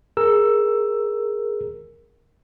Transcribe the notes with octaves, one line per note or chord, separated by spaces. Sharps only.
G#4 A#4 E6